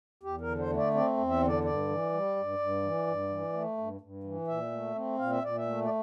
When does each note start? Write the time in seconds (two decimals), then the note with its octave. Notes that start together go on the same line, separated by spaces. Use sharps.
0.23 E2 G4
0.41 A#4
0.47 D3
0.59 C5
0.70 A3
0.76 D5
0.94 C4 D5
1.17 E2
1.29 E5
1.42 D3
1.47 D5
1.64 G2 D5
1.89 E3
2.12 G3
2.36 G2
2.59 G2
2.83 E3
3.07 G2
3.29 E3
3.53 A3
3.78 G2
4.01 G2
4.24 E3
4.47 A#2 E5
4.72 A3
4.95 C4
5.18 A#2 F5
5.30 E5
5.42 A#2 D5
5.56 E5
5.66 A3
5.85 D5